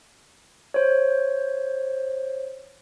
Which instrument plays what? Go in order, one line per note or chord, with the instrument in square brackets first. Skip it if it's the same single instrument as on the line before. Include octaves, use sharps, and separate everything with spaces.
[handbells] C5 C#5